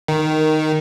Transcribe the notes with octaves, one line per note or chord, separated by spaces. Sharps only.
D#3